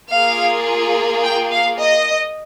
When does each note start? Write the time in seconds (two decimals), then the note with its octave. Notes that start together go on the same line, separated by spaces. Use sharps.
0.10 A#3 F4 G#4 F5
1.24 G5
1.53 F5
1.81 D#5